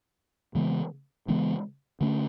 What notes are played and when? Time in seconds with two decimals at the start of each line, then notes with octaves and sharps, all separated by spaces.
0.55 C#3 E3 G#3 B3
1.28 C#3 E3 G#3 B3
2.01 D3 A3 C#4